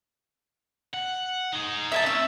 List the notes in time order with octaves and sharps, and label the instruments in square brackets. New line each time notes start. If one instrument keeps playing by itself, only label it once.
[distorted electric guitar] F#5
D#4 G#4
[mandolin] E5 G#5 A5
[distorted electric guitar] C4 C#4 [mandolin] E6